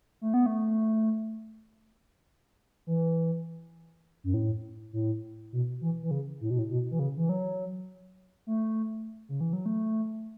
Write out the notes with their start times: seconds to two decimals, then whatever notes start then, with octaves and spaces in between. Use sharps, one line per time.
0.21 A3
0.34 B3
0.46 A3
2.87 E3
4.24 F#2
4.34 A2
4.93 A2
5.53 B2
5.81 E3
6.03 E3
6.11 C#3
6.41 A2
6.50 B2
6.59 A2
6.70 B2
6.91 E3
6.99 C#3
7.17 E3
7.29 F#3
8.47 A3
9.29 C#3
9.41 E3
9.53 F#3
9.66 A3